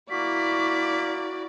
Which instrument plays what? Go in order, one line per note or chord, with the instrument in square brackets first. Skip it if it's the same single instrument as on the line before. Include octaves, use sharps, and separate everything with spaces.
[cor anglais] A#3 [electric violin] E4 D5 [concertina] F#4 [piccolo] B6